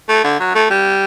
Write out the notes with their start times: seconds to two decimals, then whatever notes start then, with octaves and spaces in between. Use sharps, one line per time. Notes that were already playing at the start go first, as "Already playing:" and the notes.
0.09 A3
0.24 D3
0.40 F#3
0.55 A3
0.70 G3